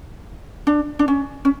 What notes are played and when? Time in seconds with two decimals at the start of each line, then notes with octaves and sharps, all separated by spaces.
0.67 D4
0.99 D4
1.08 C#4
1.45 C#4